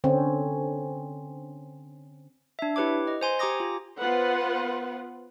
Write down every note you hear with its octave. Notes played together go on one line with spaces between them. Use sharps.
D3 C4 C#4
D4 E5
E4 G4 B4 C#5 D6
D#5
C5 G#5 C6
G4 G#5 A#5 D6 D#6 A#6
F4
B3 F4 B4 C5 F#5